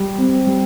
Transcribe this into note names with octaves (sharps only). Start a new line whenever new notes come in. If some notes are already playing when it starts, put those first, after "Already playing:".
Already playing: G3
C4
G3